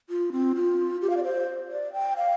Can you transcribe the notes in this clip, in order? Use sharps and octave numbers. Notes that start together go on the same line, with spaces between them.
F4
C4
F4
G4
F5
D5
C5
D5
G5
F5